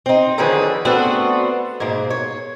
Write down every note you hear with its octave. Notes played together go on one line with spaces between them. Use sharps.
C4 D#4
D3 D#3 F3 F#3 G#4 B4
A3 B3 C4 D4 F#4
G#2 B2 A#3
C#5